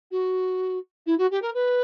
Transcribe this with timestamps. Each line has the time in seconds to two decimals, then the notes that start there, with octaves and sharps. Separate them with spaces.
0.11 F#4
1.06 E4
1.18 F#4
1.31 G4
1.42 A#4
1.54 B4